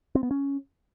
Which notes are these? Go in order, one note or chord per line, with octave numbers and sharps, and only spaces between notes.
C4
B3
C#4